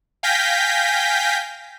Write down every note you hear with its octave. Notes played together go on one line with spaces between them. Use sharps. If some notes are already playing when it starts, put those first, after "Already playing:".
F5 G5 G#5 G6 A#6 B6